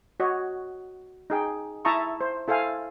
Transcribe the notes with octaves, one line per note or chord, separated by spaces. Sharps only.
F#4 C#5 D#5 F#5
D#4 G#4 G5
E4 E5 A5 A#5 C#6 D#6
C5
E4 A4 C5 F5 G#5